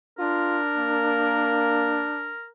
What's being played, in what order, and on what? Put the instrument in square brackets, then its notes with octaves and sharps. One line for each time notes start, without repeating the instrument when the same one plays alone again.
[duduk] D4 [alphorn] F4 [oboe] A#4
[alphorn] A#3